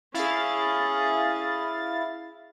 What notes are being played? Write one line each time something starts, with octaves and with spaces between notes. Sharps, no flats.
C#4 E4 G#4 F5 A6